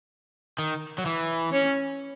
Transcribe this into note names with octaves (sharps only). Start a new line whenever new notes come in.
D#3
F#3
E3
C#4